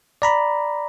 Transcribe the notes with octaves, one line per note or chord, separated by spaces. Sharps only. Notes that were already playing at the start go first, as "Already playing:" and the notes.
D5 A#5 B5